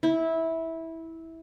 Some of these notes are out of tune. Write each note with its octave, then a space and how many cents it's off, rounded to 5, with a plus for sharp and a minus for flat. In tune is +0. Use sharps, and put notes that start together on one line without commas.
E4 -15